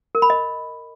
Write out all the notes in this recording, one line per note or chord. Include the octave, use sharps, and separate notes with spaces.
A#4
B5
D#5